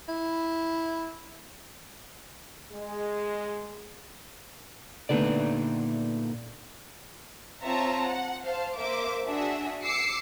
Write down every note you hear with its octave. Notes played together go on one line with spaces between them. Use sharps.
E4
G#3
A#2 D3 A3 B3 D#4 D5
C4 F4 C#5 E5 A5 A#5
F#5
C5 F5 A5
A#3 C5 E5 D6
D4 F#4 G#4 E5
D6 E6 C7 C#7